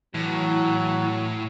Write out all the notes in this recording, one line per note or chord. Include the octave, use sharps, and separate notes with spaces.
A2 E3 F#3